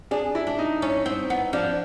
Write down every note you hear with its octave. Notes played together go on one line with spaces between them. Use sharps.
D4 G#4
E4
D4
D#4
C#4
C4
B3
F3 D4